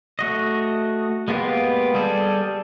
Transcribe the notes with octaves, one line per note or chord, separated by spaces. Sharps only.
A3 F#4 D#5
G#3 A#3 B3 F4 G4
G3 G#4 A4